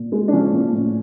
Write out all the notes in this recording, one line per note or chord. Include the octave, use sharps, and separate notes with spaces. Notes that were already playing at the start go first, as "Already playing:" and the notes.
Already playing: A#2
G#3
D4
F3 C#4
A#2
A2